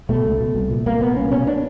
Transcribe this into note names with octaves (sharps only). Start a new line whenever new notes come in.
B2 A3
C#2
B2
C2
A#2
C2 A#3
A#2 B3
C2 C#4
B2 C#4
D4